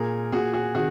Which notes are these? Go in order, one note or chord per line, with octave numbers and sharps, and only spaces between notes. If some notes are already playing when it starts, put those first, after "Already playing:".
Already playing: A#2 G#4 A#4
A#2 F#4 G#4
F#4 G#4
C3 D#3 F#4 G#4